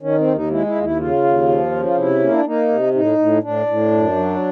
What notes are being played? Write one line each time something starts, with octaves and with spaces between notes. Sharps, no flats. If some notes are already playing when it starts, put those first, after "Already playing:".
D#3 C#4
C4
D#2
D#4
G#3 E4
E4
D#2 F4
E4
C#3 F4
D#2
F3
C#3
F4
C3 E4
A#3 C#4
D4
A#3 D#4
C3
A2 D#4
A2
A2 D4
A2
F#2
F#3